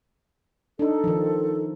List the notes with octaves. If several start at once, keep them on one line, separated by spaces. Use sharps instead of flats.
D4 D#4 A4
D#3 F3